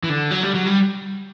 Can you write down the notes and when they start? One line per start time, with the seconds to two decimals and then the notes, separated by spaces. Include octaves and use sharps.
0.04 E3
0.09 D3
0.31 F#3
0.43 G3
0.55 F#3
0.67 G3